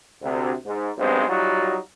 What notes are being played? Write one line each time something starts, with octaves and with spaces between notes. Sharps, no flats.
D2 C3
G#2
B1 G2 G#3 C4 C5
F#3 G3 D#4 F4 F#4